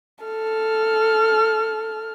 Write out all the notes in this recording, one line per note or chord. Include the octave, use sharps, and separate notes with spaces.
A4 F6